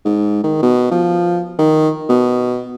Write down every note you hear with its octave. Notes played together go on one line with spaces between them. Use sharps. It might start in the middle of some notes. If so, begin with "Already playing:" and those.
G#2
D#3
B2
F3
D#3
B2